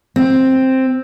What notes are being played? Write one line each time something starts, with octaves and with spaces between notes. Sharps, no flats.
C4